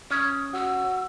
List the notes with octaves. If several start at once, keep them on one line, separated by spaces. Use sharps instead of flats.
C#4 D#6
F#4 E6